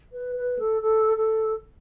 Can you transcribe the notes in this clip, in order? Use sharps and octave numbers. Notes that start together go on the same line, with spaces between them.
B4
B4
A4
A4
A4